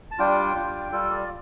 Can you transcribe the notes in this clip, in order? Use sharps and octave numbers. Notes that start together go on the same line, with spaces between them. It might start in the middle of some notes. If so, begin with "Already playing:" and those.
A5
G3 D4 F4 G5
G3 D4 F4
G3 F4 A4
D5